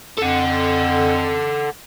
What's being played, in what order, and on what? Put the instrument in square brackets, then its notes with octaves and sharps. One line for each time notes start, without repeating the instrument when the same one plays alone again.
[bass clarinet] F2 [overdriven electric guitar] A4 F#5